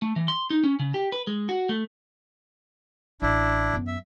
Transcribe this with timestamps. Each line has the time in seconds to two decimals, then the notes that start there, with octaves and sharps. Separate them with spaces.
0.02 A3
0.16 E3
0.28 C6
0.50 D#4
0.64 C#4
0.79 C#3
0.94 G4
1.12 B4
1.27 G#3
1.49 F#4
1.69 A3
3.22 A1 D4 E4
3.73 F#2 B3
3.87 E5